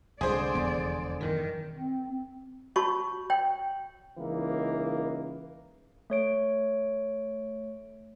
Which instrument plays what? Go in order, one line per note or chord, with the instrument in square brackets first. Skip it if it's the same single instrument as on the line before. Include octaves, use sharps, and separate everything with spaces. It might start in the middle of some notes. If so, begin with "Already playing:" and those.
[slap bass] C2 G#2 [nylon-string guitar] D3 G#3 F4 [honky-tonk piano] G#4 C5 [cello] D5
[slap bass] F1 E2 B3
[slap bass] F#2 B2 E3 [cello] D#3
[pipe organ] C4
[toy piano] F#4 C#5 A5 B5 C#6
C#5 G5
[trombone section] C#2 E3 A#3 D#4
[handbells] A3 C#5 D7